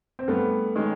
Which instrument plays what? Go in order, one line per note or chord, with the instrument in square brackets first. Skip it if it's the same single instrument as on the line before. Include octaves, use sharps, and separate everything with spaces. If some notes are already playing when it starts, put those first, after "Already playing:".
[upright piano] C4
[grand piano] G2 [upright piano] A3 B3
[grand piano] D#3 G#3 C#4